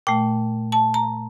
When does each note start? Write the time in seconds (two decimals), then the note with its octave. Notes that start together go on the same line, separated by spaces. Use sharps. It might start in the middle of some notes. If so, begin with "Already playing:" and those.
0.07 A#2 A3 G5
0.72 A5
0.94 A#5